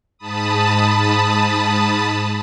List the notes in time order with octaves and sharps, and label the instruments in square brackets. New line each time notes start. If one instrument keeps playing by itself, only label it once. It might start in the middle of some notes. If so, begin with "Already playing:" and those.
[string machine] G#2 A5 B5 D#6